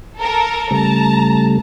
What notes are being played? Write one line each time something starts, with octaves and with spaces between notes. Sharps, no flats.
A4 A#4
C#3 G3 A3 A5 A#5